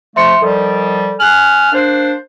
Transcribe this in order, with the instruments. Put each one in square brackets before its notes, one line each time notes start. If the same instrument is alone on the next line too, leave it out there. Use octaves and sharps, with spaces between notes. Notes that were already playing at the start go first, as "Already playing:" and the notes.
[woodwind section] F2 F3 A3 [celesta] E5 C6 C#7
[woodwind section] D#3 F3 G3 [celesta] A4
[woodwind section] G#5 F6 [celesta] F#6 F#7
[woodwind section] A#3 D4 C5